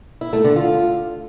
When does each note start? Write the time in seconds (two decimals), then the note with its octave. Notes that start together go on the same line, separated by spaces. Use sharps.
0.21 E4
0.33 A3
0.44 D3
0.56 F4